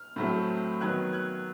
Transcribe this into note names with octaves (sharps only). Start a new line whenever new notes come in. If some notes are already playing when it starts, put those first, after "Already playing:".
Already playing: F6
A2 F#3 A3 C4
D#3 F#3 B3 F#6 G#6
F#6 G#6